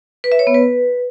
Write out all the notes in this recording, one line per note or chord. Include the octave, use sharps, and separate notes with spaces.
B4
E5
C#5
B3
B4